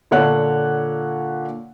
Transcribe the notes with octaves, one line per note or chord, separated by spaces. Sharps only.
A#2 D3 C#5 F#5 F#6